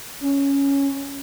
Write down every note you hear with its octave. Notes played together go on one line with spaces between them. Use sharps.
C#4